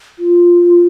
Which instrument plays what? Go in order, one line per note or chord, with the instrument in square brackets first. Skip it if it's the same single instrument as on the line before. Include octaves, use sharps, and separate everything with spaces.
[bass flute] F4